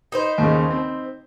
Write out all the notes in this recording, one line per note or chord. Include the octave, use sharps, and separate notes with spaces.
D#4 B4 C5
D#2 C#3
C4